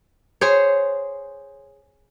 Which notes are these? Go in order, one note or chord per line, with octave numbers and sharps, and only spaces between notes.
G#4 C5 C#5